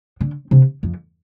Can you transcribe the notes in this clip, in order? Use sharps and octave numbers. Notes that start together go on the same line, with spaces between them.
D3
C3
F2